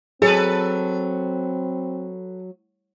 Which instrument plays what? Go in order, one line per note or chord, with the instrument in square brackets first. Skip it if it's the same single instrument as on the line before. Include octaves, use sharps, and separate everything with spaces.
[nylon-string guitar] F#3 [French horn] C4 [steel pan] G#4 [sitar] A4 B4